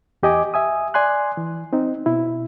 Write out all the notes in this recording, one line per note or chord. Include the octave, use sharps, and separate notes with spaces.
E2 G4 D#5 G#5 D6
E5 G#5 D#6
D5 G#5 C6 F#6
E3
C4 D#4
B2 E4